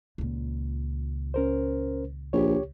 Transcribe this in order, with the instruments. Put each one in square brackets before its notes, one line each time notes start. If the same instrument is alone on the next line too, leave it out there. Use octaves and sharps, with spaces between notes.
[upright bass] C#2 A#2
[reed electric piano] C#4 A#4 C5
[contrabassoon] A#1 [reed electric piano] G4 C#5